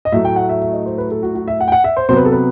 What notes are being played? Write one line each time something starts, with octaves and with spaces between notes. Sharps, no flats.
D#5
A2 F#3 A3 E5
G5
F#5
E5
E5
D#5
C5
B4
A4
F#4
F#4
E5
F#5
G5
F#5
E5
C5
C3 F#3 B3 C5
B4
A4
B4